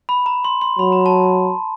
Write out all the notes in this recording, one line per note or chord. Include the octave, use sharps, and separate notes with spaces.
B5
A#5
C6
C6
F#3 B5
A#5
A5